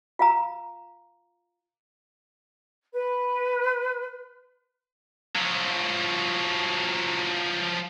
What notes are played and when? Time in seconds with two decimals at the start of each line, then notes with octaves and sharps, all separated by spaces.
0.19 F4 F5 A#5
2.93 B4
5.35 F3 F#3